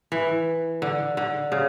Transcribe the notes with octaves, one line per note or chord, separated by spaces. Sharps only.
E3
D3
D3
C#3